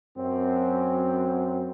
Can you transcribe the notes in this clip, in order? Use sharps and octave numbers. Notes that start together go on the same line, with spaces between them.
F#2 C4